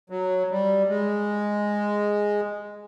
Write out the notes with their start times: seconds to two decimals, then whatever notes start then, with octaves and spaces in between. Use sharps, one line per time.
0.10 F#3
0.50 G3
0.89 G#3